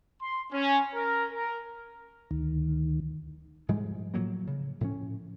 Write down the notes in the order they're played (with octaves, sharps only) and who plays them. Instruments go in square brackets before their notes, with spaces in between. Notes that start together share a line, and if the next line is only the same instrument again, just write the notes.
[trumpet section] C6
C#4
A#4
A#4
[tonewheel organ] D2 D#3
[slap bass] G#2 F3 G3 G#3
A2 F3 F#3 A#3
C#3
A2 F3 C#4